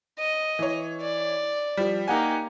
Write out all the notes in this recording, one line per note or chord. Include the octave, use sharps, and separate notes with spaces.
D#5
E3 C#5
D5
F3 G3
A#3 D#4 G4 F#5 G#5